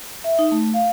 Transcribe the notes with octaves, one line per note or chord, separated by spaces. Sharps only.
E5
D#4
A3
F5